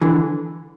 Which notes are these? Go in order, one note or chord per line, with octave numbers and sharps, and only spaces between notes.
D3 E3